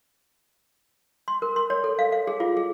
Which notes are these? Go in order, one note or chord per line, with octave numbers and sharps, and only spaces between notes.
C6
A#4
C6
C#5
A4
F5
F5
G#4
F4
G#4